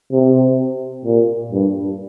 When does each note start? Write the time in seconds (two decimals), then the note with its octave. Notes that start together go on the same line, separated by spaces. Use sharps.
0.12 C3
1.05 A#2
1.52 G2